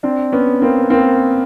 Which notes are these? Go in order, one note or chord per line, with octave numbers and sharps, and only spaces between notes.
C4 D4
B3 C#4
A#3 C4
A#3 C4